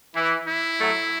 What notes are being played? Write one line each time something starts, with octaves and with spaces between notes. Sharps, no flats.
E3 E4
E4
F#3 A3